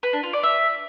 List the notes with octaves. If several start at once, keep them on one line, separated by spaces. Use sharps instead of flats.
B4
D4
F4
D5
E5